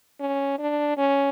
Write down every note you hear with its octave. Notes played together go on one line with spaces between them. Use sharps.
C#4
D4
C#4